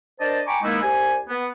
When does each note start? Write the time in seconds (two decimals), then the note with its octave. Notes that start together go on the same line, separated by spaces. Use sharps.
0.20 D4 A#4 C5 D5 D#5 A5
0.47 G5 G#5 A#5 B5 C#6 D6
0.63 D#3 G#3 A#3 B3 D#4 E4
0.82 C2 G4 C5 G#5
1.29 B3